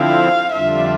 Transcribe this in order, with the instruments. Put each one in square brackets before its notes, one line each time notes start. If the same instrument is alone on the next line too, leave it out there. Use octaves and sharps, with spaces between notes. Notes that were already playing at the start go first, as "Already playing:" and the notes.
Already playing: [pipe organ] D3 F3 C4 E4 [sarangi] F5
[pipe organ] F2 D3 G3 D4 F4 [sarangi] E5